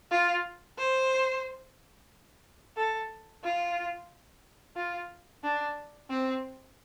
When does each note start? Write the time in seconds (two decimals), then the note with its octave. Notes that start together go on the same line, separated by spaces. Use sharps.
0.11 F4
0.79 C5
2.77 A4
3.44 F4
4.76 F4
5.44 D4
6.10 C4